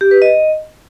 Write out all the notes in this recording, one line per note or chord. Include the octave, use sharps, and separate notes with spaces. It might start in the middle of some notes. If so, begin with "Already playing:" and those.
G4
B4
D#5